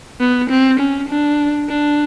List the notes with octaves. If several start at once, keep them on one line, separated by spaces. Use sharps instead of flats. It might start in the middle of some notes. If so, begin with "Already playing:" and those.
B3
C4
C#4
D4
D4